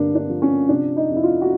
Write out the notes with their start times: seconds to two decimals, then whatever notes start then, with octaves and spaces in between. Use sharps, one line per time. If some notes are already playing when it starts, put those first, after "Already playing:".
Already playing: G2 D3 A#3 D4
0.15 D4
0.29 F3
0.42 C#4
0.69 C3 D4
0.96 D#4
1.10 F2
1.16 E4
1.24 F4
1.41 F#4